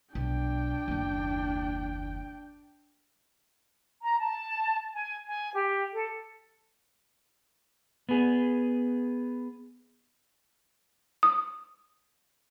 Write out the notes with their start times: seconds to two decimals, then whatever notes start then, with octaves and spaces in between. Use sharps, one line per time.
0.15 B1 D4 G5
0.88 F#1 D#2
4.02 A#5
4.20 A5
4.94 G#5
5.27 G#5
5.53 G4
5.93 A4
8.09 B3 G#4
11.23 D#6